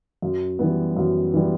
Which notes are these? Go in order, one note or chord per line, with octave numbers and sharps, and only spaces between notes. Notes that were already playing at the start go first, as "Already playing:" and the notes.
F#2
E3 G3 B3
F#2
E3 G3 B3